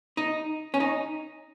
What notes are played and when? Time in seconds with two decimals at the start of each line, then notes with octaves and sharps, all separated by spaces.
0.17 D#4
0.74 C#4
0.80 D#4